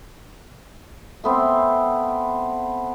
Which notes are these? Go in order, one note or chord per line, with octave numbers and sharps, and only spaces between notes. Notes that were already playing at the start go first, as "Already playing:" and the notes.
A3 B3 C4